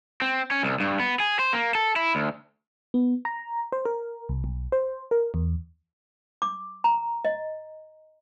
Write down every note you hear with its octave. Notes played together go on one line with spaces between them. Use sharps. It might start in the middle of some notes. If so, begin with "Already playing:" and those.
C4
C#4
C2
G2
B3
G#4
C5
A#3
A4
E4
D2
B3
A#5
C5
A#4
C2
B1
C5
A#4
E2
D6
A#5
D#5